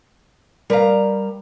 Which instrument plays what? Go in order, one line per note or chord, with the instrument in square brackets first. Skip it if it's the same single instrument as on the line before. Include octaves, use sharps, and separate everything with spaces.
[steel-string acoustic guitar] G3 A#5 [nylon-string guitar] A#4 B4 F5